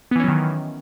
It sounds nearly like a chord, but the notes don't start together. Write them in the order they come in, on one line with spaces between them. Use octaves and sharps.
B3 E3 C#4 F#3 D#3